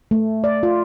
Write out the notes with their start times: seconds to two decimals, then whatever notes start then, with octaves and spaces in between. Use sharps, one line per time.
0.11 A3
0.44 D5
0.63 F4